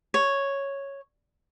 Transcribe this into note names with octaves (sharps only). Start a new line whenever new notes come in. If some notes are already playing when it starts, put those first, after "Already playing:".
C#5